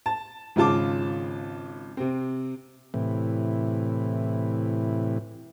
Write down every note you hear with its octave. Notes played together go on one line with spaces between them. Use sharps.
A5
G#1 C#3 F4 A5 D6
C3 C4
A2 C3 E3